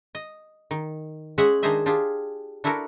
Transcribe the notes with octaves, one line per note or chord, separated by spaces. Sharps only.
D#5
D#3
G#3 C#4 G#4 E5 F#5
D#3 D4 G#4 C5 D#5 E5
D4 F4 G4 G#4
D4 E4 F#4 A4 A#4